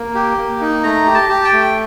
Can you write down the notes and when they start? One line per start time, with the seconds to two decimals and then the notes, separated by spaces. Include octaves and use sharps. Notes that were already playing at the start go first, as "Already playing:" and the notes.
Already playing: A#3
0.15 G4
0.38 A#3
0.61 D#4
0.83 A3 A#5
1.06 G4
1.14 A5
1.29 G4
1.45 G5
1.53 A3